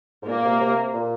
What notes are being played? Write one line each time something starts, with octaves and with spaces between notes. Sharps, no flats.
G#2
A#2 A#3
C3
C3
A#2